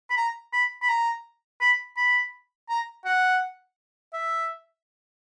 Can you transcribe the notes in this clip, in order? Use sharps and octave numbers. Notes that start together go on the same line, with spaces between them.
B5
A#5
B5
B5
A#5
B5
B5
A#5
F#5
E5